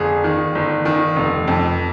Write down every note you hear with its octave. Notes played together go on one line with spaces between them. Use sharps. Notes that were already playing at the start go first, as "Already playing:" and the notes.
Already playing: G1 F2 G#4
D#3
G1
D#3
F1
F2